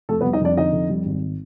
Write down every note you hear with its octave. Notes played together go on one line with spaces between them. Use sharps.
F2 A3 A4
B3 B4
G3
D#4 D#5
F2 D4 D5
D3 D#4 D#5
F2
G3
G#1